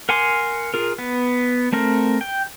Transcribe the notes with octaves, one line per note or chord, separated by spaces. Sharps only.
A#4 F#5 G#5 C6 D6
F4 G#4 A#4
B3
A3 C4 A#4
G5